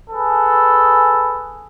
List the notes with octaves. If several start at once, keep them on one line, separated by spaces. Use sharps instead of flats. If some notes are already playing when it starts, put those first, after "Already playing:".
G#4 A4 B4